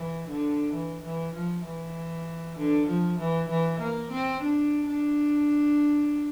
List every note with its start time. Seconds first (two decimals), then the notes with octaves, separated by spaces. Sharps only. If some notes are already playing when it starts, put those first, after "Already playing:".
Already playing: E3
0.28 D3
0.73 E3
1.04 E3
1.34 F3
1.66 E3
2.57 D3
2.87 F3
3.19 E3
3.49 E3
3.80 A#3
4.11 C4
4.41 D4
4.87 D4